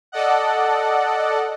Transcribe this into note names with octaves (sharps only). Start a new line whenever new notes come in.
A4 D5 D#5 F#5